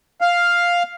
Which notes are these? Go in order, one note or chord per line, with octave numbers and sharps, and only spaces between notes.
F5